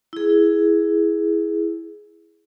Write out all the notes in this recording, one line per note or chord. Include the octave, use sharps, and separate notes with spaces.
E4 G#4